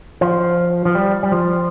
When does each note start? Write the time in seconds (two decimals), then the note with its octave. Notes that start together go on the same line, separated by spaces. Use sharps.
0.21 F3
0.85 F3
0.95 G3
1.23 G3
1.32 F3